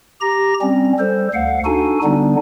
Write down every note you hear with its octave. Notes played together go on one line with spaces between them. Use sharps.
G4 A#5 A#6
G3 C4 C#4
G3 A4 C5
D2 F5 F#5
D4 D#4 F#4 A4 G#5
D3 G3 B3 D4 D#4